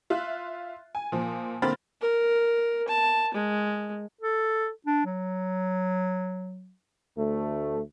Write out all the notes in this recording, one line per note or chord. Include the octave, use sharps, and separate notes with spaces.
F4 E5 F#6
G#5
A#2 F3
D3 A#3 C4 B5 F6 A6
A#4
A5
G#3
A4
D4
F#3
D2 A3